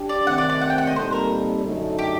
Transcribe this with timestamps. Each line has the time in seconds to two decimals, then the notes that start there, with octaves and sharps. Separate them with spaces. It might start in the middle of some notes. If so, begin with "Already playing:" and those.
Already playing: D4 G4
0.09 D5
0.27 C3 D#3 A3 C4 F#5
0.38 D5
0.49 D5
0.61 F#5
0.70 G5
0.78 F#5
0.87 D#5
0.95 A#2 G3 C4 D#4 A4 C5
1.12 A#4
1.64 F#2 D3 A3 D#4 A4
1.99 G4